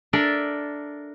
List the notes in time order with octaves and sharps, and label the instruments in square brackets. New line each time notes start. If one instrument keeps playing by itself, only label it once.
[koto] D4 A4 A#4 D5 E5